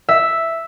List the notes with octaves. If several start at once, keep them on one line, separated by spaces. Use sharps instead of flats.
E5